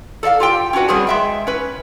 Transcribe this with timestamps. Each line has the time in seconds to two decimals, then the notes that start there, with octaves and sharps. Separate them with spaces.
0.23 A4 D5 E5 F5
0.40 F4 G4 G5
0.73 C#4 D4 F#4 B4
0.88 F#3 G3 B3 C4 G#4
1.07 G#3 E5 G5
1.47 C#4 B4